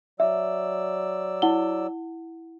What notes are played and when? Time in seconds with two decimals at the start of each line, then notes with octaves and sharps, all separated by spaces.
0.20 F#3 D5 E5 E6
1.42 E4 F#5 G7